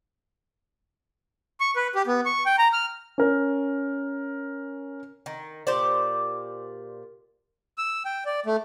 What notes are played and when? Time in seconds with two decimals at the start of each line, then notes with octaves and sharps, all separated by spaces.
1.60 C#6
1.76 B4
1.95 G4
2.07 B3
2.26 C#6
2.46 G5
2.58 A#5
2.73 F6
3.18 C#4 A#4
5.26 D#3
5.67 A#2 G4 C5 D5
7.78 E6
8.05 G5
8.26 D5
8.46 A3